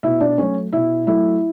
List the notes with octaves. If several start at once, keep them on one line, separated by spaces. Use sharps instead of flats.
B2 E4 E5
D4 D5
F#3 A3 C#4 C#5
B2 E4 E5
F#3 A3 E4 E5